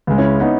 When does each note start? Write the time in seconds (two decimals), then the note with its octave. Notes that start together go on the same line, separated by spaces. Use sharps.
0.07 C#2 C#3 G#3
0.18 C#4 E4
0.40 B3 D#4